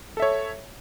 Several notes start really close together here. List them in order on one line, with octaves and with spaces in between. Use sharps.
A4 E5 C#5